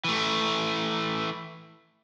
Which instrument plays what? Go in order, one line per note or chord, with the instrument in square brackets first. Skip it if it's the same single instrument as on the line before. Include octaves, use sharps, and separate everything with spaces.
[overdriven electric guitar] E3 A3